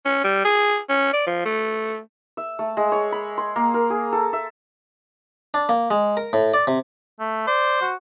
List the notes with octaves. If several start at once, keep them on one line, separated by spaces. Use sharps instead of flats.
C#4
G3
G#4
C#4
D5
F3
A3
E5
A3
G#3
C#5
B5
C6
A#3
A#4
G#4
A4
E5
D4
A#3
G#3
A#4
A2
D5
C3
A3
C5 D5
F#4